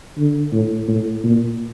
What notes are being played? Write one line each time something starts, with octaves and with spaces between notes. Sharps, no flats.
D3
A2
A2
A#2